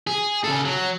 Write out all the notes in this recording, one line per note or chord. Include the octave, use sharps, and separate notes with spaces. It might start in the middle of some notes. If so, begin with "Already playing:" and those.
G#4
C#3 A4
F#3